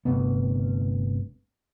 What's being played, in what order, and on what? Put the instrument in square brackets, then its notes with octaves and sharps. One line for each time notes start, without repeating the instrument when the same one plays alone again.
[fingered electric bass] G1 D2 C3 B3